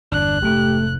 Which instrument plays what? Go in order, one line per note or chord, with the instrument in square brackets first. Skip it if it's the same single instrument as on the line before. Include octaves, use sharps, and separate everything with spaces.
[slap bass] G1 E2 [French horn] D4 [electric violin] F#6
[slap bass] F1 G#2 [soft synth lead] A3 [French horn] G4